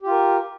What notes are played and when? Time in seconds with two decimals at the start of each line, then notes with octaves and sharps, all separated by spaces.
0.02 G4
0.07 F4
0.11 A#4